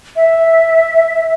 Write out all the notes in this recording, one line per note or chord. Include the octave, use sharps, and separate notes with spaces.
E5